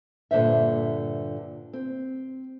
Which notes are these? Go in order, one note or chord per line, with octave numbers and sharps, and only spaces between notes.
G2 A#2 D3 C5 E5
C4